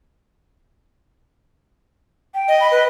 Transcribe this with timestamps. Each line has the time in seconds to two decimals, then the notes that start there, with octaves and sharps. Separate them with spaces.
2.34 G5
2.48 D#5
2.60 B5
2.72 B4